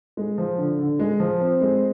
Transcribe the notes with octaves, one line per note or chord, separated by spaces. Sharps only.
G#3
F3
D3
D3
G#3
F3
C4
G#3